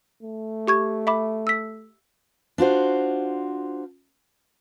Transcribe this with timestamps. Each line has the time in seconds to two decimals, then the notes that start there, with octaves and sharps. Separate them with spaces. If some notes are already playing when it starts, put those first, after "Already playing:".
0.23 A3
0.68 G4 C#6 G#6
1.07 E5 B5 D6
1.47 E6 B6
2.58 D4 F4 F#4 C5